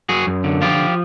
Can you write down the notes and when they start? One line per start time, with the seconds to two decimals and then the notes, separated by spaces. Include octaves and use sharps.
0.09 F#2 F#4 G#4
0.27 F#2
0.44 D3
0.62 F3 F4 G4